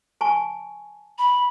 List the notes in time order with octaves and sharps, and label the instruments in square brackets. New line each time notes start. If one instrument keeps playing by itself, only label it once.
[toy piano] G#5 A5 C#6
[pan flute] B5